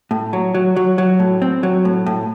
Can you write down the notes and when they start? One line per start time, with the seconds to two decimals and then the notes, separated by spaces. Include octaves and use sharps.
0.11 A2
0.33 F#3
0.54 F#3
0.76 F#3
0.98 F#3
1.20 A2
1.42 C4
1.63 F#3
1.85 A2
2.06 A2